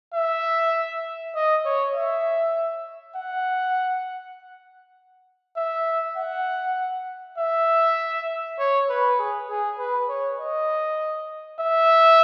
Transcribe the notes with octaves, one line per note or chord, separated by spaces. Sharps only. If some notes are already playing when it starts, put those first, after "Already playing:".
E5
D#5
C#5
E5
F#5
E5
F#5
E5
C#5
B4
G#4
G#4
B4
C#5
D#5
E5